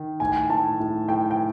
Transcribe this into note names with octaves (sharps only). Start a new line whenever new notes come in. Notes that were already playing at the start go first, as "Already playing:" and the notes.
Already playing: D#3
A2 G#5
A2 A5
A2
A2 G5
G5